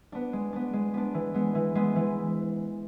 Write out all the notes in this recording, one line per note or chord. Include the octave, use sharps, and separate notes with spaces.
B3 D4
G#3
B3 D4
G#3
B3 D4
E3
G#3 B3
E3
G#3 B3
E3